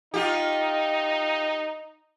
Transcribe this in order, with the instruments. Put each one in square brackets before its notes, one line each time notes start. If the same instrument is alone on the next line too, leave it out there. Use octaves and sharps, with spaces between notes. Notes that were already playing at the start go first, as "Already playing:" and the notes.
[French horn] D#4 [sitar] F4 G4